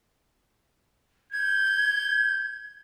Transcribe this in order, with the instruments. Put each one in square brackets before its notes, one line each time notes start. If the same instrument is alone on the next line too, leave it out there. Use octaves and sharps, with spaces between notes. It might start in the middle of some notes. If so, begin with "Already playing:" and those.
[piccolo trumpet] G6 [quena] G#6